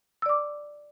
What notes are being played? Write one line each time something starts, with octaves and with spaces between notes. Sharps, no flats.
D5 D6 E6